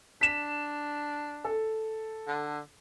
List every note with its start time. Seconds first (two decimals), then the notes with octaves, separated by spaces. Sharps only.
0.21 D4 B6 E7
1.44 A4
2.28 D3